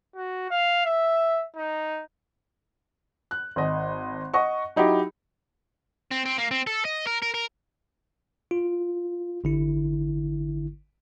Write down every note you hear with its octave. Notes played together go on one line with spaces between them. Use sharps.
F#4
F5
E5
D#4
F#6
G#1 D#5
D#5 F#5 C#6
F#3 D#4 E4 G4
C4
C4
A#3
C4
A4
D#5
A#4
A#4
A#4
F4
G#1 D3 E4